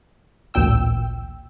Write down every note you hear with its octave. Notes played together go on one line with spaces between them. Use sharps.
A1 D2 A#2 G5 E6